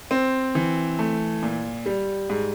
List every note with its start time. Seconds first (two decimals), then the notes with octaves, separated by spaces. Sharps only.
0.11 C4
0.55 E3
0.99 A3
1.42 A#2
1.86 G3
2.29 G#2